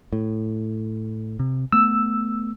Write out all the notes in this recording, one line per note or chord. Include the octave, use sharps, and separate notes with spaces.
A2
C3
A3 B3 E6